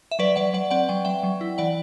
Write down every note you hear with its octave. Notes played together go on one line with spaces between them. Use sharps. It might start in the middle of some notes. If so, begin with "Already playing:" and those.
E5
F#3 B4 D5
F#3 D5 F#5
F#3 D5 F#5
C4 D5 F#5
F#3 G5
F#3 E5 G5
F#3
E4
E3 D5 F#5